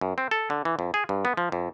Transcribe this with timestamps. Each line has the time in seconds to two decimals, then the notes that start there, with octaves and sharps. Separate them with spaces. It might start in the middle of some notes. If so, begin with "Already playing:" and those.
0.01 F#2
0.18 C4
0.31 A4
0.50 D3
0.65 E3
0.79 F2
0.94 G#4
1.09 G2
1.25 B3
1.37 F3
1.52 F2